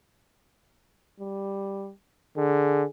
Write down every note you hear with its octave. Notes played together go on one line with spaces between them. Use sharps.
G3
D3 G#4